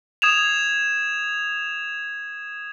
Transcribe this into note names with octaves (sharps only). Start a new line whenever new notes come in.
D#6 G#6 E7 F7